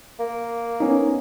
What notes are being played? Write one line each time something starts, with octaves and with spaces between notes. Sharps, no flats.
A#3
B3 C#4 D#4